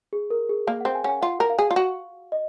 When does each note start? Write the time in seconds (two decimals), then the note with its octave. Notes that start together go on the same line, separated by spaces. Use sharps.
0.13 G#4
0.30 A#4
0.49 G#4
0.67 A#3 F5
0.81 F#5
0.85 C4
0.95 G#5
1.04 C#4 F#5
1.09 G#5
1.22 F4 F#5
1.40 A#4
1.50 F5
1.58 G#4
1.71 F4
1.76 F#4
2.32 D#5